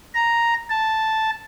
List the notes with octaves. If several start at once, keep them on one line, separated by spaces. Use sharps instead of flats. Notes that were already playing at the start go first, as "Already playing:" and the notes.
A#5
A5